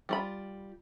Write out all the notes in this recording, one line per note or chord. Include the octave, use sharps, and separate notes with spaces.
G3 F4 B5